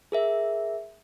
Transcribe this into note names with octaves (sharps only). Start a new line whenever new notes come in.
G#4 A#4 E5